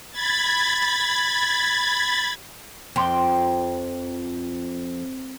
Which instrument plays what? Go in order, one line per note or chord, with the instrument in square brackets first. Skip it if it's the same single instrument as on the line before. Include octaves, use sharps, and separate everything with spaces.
[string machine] B5 G#6 A6
[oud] F2 [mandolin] G5 C6 D6